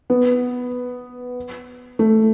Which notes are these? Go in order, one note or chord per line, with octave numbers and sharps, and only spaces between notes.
B3
A3